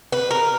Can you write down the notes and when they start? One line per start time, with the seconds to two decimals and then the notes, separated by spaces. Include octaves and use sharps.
0.12 B4
0.31 A#4